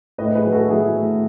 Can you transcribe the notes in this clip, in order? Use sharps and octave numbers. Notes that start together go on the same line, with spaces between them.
A2 B4 D#5
G#4 B4
F#3
F#4 A4
F#3 E4 G#4
A2